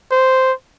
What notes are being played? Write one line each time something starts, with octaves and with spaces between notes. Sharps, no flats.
C5